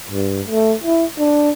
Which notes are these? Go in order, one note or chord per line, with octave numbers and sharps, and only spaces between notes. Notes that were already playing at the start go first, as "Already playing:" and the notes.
G2
A3
E4
D4